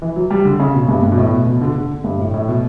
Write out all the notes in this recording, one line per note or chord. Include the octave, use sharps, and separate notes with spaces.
E3
F#3
G3
D3
C#3
B2
G2
G2
B2
A2
B2
B2
D3
D3
G2
A2
A2
B2